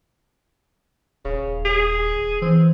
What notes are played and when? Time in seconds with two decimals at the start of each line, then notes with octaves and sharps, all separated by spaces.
1.25 D#1 C#3
1.65 G#4
2.42 E3 C4